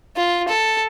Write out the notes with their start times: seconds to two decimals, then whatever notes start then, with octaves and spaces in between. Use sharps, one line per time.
0.16 F4
0.48 A4